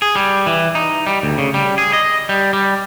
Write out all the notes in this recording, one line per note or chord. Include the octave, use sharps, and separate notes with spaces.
G#4
G3
E3
D#4
G3
D2
C#3
G3
G#4
D#5
G3
G3